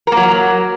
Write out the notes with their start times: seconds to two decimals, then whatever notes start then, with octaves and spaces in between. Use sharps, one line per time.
0.07 A#4
0.12 A#3
0.17 F#3